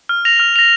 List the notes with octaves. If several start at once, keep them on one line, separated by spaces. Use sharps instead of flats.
F6
A#6 F7
F6
A#6 F7